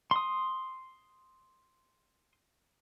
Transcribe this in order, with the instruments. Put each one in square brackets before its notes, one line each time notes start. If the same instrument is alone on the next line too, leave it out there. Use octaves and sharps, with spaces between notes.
[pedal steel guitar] C6 D#6